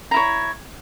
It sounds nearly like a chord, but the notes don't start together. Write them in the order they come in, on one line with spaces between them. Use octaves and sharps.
A#5 E4 C#5